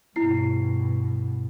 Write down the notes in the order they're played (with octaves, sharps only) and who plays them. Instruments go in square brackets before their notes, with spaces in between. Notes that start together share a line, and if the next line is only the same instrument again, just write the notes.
[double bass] G2 B2 [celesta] E4 C7